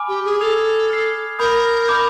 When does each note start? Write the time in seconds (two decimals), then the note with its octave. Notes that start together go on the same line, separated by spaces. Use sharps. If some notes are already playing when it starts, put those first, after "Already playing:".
Already playing: G#5 B5 D6 F6
0.08 G4
0.25 G#4
0.40 A4 D#6 G#6 C7 F7
0.90 F6 G#6 C7
1.39 A#4 B5 D#6 G6
1.88 B5 D6 G6